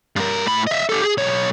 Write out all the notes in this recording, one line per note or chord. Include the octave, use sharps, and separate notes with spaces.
G2 A#4
A2 B5
D#5 E5
G4 A4
G#4
B1 C#5